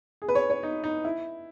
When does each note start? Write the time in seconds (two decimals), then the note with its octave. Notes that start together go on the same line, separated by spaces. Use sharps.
0.22 G#4
0.28 B4
0.35 C#5
0.50 C#5
0.63 D#4
0.84 D#4
1.04 E4